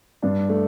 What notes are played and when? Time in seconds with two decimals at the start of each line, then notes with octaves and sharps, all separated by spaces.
0.22 G2 D4
0.49 A3